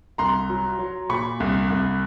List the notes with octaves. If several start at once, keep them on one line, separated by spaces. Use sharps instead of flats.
C2 A#5 C6
F#3
F#3
A#2 B5 C#6
C2
C2